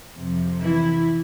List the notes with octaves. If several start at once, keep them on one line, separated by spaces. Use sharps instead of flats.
F2 C3 F3
E3 E4